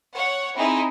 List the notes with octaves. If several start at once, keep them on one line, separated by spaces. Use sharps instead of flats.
C#5 F#5
C4 D#4 E4 G#4